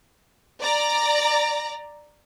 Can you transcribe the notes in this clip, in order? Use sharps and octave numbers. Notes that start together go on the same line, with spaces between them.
D5 A#5